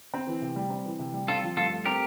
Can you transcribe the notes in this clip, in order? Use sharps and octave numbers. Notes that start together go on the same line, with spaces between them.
C4
E3
C3
G3
C4
E3
C3
G3
C4 F4 A4
F3
G2 F4 A4
A3
C4 G4 A#4